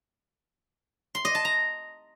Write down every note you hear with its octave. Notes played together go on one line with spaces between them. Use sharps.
C6
D#5
A5
A#5